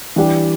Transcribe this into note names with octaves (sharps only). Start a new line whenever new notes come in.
E3 G3 D4 G4